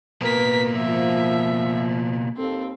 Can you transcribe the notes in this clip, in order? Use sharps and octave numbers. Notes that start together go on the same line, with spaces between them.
B2 A#3 A#4 B4 B6
F3 E5
D#2 C4 A4